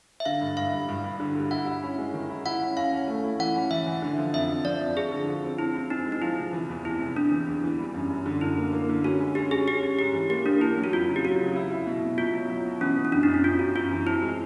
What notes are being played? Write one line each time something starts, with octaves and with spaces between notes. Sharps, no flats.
E5
D3 F5
G2
G2 F5
G2
G2
G2
D3
G3
E4 F#5
E4
C#4
G#3
D#3
E4
E4 F#5
C#4
C#4 F5
C#4
A3
E4
E3 F#5
C#4
E3 E5
E3
D3
F3
F2 E5
F2
F3 D5
F2
F3 G#4
D3
F3
C4
C4 E4
C4
C4 D#4
G#3
D#4
F3 E4
C3
E3
E2
C3 E4
E2
E3 D4
E3
E2
E3
G3
F#2
F#2
D3
F#2 E4
A#3
A#3
D3
C#4 F#4
G#3
C#4 G4
C#4 G#4
C#4 G4
C#4
G#2 G4
E3
A#3 G4
A#3 D4
A#3 E4
F#3
F#4
F2 F4
C#3
G4
F#3 F#4
C#3
E4
E4
B2
B2
B2 F4
F#3
F#3
B2
E3 C#4
E3
C#4
F#2 D4
D#4
F#2
D4
F#2 F4
F#2 F#4
F#2 F4
E3
C4 E4
G#3